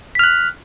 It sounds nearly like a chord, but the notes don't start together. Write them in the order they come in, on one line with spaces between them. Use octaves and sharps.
B6 F6 F#6